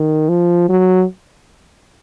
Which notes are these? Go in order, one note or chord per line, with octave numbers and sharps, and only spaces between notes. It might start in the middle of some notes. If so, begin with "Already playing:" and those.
Already playing: D#3
F3
F#3